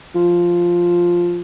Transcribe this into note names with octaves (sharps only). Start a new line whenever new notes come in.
F3